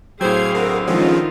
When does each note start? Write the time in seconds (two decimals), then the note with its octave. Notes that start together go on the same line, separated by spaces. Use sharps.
0.21 A2 F#3 C4 G#4 C5 F5 G#6
0.55 D3 B3 C4 A#4
0.87 D#3 F3 G#3 C#4 F4